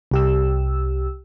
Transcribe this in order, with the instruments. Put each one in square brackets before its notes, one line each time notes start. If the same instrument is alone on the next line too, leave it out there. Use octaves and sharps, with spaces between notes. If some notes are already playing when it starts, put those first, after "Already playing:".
[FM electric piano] C2 G4 E6